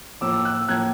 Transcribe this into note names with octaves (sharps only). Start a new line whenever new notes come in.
A2 F3 A#3 D6 E6
E6 F#6
A2 F3 A#3 F#6 G#6